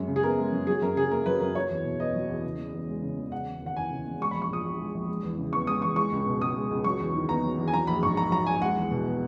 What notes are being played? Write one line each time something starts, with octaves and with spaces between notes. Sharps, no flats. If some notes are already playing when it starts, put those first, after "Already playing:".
Already playing: F#2 G#3
C#3
G#4
B3 A#4
G#3
F#2
F#3 G#4
F#2 A#4
C#3 G#4
A#3 A#4
F#3 B4
F#2 A#4
F#3 C#5
E2
B2
B3 D#5
F#3
E2
C#3
E1
E2
G#3
C#3
E1
C#3 F#5
E1
D#2
F#5
E3 G#5
C#3
E1
G#3 C#6
A#1 B5
C#6
A#2 D#6
A#1
G#3
A#1
G#3
E2
C#3
B3 C#6
G#3 D#6
E2 C#6
G#3 C#6
C#2
B2
C#2 D#6
G#3
C#2
F#3 C#6
E2
D#3
B3 A#5
F#3
E2
G#5
F#3 A#5
A#1 B5
G#2 C#6
A#3 A#5
F#3 A#5
A#1 G#5
G#3 F#5
E2
B2
B3